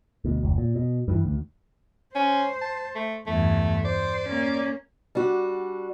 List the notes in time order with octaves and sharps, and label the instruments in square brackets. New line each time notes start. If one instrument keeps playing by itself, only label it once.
[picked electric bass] D2 B2
F1 C#2
A#2
B2
G2 D#3 E3
D2
[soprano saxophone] C#4 [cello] C5
[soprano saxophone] A5
A3
[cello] E2 G2 [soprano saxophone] A3
[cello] C5 [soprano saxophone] D5
[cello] A#3 C#4
[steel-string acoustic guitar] G3 D4 F#4